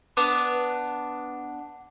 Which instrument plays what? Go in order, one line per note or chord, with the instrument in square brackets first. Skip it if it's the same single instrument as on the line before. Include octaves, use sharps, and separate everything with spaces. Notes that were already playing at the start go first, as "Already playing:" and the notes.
[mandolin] B3 D4